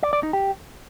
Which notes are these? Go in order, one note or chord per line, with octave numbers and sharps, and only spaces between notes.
D5
D5
D#4
G4